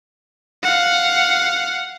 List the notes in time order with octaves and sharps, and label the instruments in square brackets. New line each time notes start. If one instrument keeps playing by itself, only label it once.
[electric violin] F5 F#5